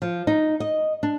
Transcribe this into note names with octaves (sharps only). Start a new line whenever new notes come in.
F3
D#4
D#5
D4